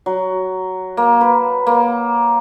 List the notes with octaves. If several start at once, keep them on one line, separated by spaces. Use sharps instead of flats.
F#3
A#3
B4
A#3